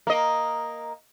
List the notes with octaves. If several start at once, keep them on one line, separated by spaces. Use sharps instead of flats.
A#3 D#5